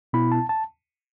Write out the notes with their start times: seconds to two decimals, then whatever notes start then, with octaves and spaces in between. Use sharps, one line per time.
0.13 B2 B3 E4 B5
0.32 A5
0.49 A5